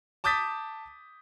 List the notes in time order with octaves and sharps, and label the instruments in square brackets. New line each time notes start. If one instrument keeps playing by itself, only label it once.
[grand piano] A5 D6 D#6 G6 A6 B6